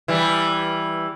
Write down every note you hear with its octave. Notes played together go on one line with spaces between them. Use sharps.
E3 G3